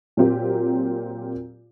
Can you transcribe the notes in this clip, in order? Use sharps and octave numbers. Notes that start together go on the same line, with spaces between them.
A#2 F#3 A#3 C4 F4 G4